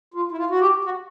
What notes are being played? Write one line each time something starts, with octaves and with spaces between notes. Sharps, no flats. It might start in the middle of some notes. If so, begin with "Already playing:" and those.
F4
E4
F4
F#4
G4
F#4